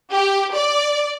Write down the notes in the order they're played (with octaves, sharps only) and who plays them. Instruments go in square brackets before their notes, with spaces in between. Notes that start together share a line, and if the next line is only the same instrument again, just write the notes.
[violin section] G4
D5